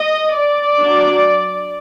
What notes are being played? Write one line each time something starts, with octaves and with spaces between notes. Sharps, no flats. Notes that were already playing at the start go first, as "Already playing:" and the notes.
Already playing: D#5
D5
F#3 D4